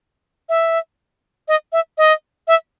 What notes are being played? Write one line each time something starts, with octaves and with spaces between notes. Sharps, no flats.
E5
D#5
E5
D#5
E5